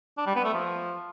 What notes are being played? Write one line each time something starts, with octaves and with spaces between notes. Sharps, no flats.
D4
G3
B3
A3
F3